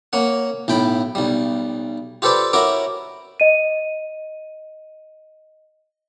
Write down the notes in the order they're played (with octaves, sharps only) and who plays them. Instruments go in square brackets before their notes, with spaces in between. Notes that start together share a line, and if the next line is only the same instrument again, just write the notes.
[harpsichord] A#3 C#4 F#5
B1 A2 G5 B5
B1 G3
F4 G4 A4 B4 C5 D5
C#4 E4 F#4 A#4 D6
[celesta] D#5 D#7